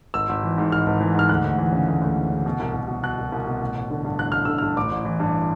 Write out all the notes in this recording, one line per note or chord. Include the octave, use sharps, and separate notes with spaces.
G#1 E6
G#1
E3
G#2
G#1 F6
G#1
E3
G#2 F6
D2 F#6
D2
E3
C#3
D2
D2
E3
C#3
B2
C2
C2
B2
B2 F#6
C2
C2
B2
A1
A1
D3
G2
A1 F#6
A1 F6
D3 E6
F6
G2
A1 D6
A1
E3
G2